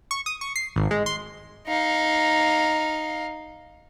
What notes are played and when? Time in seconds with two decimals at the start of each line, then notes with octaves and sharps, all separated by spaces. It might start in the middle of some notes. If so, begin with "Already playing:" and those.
0.11 C#6
0.26 D#6
0.41 C#6
0.56 C7
0.76 G#1
0.91 G#3
1.06 C6
1.67 D#4 F5